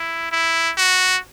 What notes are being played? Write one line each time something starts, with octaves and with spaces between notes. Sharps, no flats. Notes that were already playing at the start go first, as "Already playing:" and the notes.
Already playing: E4
E4
F#4